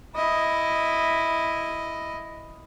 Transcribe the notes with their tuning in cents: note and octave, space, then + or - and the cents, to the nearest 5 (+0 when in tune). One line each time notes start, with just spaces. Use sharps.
E4 +0 D#5 +0